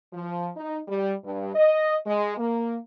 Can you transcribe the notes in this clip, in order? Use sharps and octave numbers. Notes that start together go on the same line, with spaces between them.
F3
D#4
G3
G2
D#5
G#3
A#3